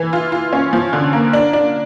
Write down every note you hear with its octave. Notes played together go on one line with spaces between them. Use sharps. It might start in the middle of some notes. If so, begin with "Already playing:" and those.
Already playing: E3
F4
F4
C#4
F3
D3
A#3
D4
D4